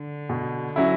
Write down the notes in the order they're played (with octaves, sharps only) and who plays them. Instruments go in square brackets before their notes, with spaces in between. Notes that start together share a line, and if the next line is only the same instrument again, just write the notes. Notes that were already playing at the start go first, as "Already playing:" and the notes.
Already playing: [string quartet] D3
[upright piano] B2
F#3 C#4 E4